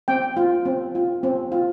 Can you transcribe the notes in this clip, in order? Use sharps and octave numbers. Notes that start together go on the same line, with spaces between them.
C4 G5
F4
C4
F4
C4
F4